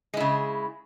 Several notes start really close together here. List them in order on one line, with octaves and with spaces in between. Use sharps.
G#3 E4 C#3